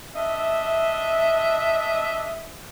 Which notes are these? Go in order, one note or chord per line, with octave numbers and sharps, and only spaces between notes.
D4 D#5 E5